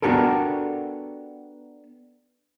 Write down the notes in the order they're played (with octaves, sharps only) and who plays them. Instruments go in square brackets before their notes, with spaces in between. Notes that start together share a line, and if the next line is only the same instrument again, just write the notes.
[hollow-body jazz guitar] B3 D4 F#4 G4 A4 A#4